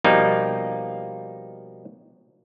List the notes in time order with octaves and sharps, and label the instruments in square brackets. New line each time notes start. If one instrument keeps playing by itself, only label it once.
[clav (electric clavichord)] B2 F3 G3 A#3 D#4